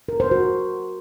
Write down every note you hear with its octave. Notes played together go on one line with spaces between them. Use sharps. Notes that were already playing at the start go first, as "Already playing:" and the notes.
A#4
C5
F#4